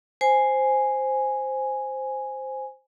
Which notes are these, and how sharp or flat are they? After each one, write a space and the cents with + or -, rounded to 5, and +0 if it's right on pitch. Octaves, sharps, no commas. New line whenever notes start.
C5 +0 G#5 +0